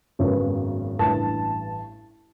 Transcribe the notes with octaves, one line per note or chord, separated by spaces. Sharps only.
G#1 F#2 C#3 F#3 B3
A1 G2 E3 A5